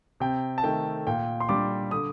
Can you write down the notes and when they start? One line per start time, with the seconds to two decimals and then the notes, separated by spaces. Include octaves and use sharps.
0.20 C3 G5
0.58 A5
0.63 D#3 A3 G5
1.07 A#2 G5
1.40 C6
1.49 G3 D4 D6
1.91 D3 D#6